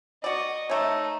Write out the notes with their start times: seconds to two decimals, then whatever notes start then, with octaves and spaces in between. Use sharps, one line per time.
0.24 F#4 D5 D#5 C#6
0.70 A3 D#4 C#5